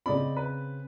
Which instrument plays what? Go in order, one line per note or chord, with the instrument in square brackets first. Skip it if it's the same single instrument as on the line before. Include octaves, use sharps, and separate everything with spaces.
[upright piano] C#3 C4 [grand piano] D5 D#5 B5
[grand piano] B4